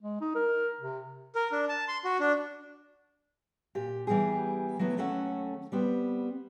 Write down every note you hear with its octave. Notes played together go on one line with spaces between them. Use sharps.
G#3
D#4
A#4
C3
A#4
D4
A5
C6
F#4
D4
A#2 G4
E3 G3 B3 G4 G#4
F#3 A3 B3 E4
D#2 F#3 A3 C#4 A4 F#5
G3 B3 C4